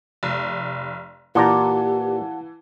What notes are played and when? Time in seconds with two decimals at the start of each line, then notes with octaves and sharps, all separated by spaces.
0.23 F1
1.35 A#2 E3 G4 D5 F5 F#5 A5 A#5